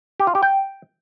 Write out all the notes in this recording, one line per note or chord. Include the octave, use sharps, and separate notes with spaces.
G4
F4
G4
G5